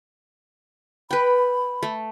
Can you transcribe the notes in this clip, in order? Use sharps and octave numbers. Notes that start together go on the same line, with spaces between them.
B4 G5 B5
A3